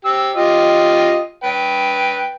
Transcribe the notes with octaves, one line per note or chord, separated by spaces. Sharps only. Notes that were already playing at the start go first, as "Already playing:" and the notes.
G4 E6
F4 G4 D#5
B4 G5